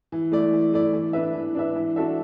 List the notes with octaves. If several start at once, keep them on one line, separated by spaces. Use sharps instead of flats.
E3
A3 E4 D5
E3
A3 E4 D5
E3
D4 B4 E5
E3
D4 B4 E5
E3
D4 F#4 A4 E5